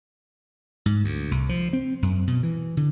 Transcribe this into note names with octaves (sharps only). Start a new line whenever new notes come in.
G#2
D2
C2
F3
C4
F#2
B2
E3
D3